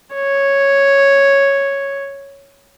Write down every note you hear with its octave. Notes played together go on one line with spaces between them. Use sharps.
C#5